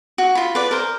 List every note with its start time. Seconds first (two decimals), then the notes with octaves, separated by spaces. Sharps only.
0.18 F#4
0.35 F4 B5
0.55 B4 D5
0.71 A#4 C5